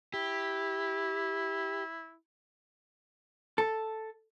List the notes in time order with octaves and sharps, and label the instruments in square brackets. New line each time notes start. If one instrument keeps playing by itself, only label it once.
[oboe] E4 [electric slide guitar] G4
[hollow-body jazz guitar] A4